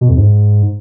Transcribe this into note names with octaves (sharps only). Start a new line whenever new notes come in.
B2
F2
G#2